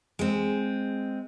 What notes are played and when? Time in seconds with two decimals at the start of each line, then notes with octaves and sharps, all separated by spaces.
0.19 G#3 C4